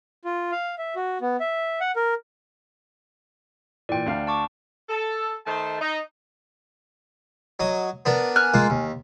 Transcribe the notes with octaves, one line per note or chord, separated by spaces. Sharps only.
F4
F5
E5
F#4
B3
E5
F#5
A#4
A#2 E3 D5 G5
D2 D4 F5
A5 C#6 D6
A4
D#3 A3 D#4 C5 A5
D#4
F#3 D#5
B3 D4 A#4
G#5 F6 F#6
G#3 A#3 F4
D#2